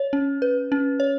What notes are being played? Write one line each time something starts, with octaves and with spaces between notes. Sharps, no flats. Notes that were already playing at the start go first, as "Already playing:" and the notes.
Already playing: C#5
C#4
B4
C#4
C#5